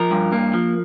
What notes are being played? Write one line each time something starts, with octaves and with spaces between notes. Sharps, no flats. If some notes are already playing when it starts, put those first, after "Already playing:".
Already playing: F3 A#4
G2
A#3
F3